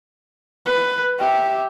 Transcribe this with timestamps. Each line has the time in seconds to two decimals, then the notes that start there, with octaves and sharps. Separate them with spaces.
0.66 B4
1.19 G4 E5